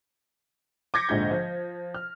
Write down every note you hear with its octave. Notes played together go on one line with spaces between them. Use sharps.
D6 G6 G#6 A#6 B6 C#7
A#1 G#2 D3 G6
F3
F6